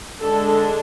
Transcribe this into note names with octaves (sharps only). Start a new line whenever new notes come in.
D3 G#3 D4 A4